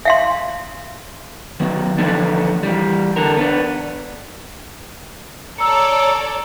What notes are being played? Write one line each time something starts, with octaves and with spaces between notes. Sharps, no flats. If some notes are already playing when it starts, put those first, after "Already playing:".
E5 F5 C6
D#3 F#3 B3
D3 E3 F3 A3 B3 D4
E3 G3
D3 A4 A#4
B3 D4
A4 C#5 D5 A5 A#5 E6 C#7